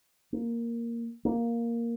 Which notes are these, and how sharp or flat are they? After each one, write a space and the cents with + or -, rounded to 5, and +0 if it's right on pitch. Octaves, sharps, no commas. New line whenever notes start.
A#3 +0
A#3 +0